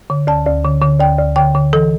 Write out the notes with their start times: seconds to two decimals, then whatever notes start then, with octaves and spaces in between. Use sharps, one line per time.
0.10 D3
0.27 D2 A5
0.46 D2
0.65 D3
0.82 D3
1.00 D2 G5
1.18 D2
1.36 D3 G5
1.55 D3
1.73 E3 A4